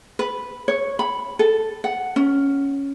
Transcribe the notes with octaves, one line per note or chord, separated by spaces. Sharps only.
B4
C#5
B5
A4
F#5
C#4